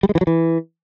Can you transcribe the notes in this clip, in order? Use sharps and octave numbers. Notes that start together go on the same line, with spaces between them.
G3
G#3
E3
F#3
E3